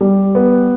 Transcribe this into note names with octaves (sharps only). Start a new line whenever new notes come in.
G3
B3